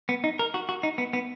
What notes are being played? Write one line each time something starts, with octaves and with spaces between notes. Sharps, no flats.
B3
D#4
A#4
F#4
F#4
D#4
B3
B3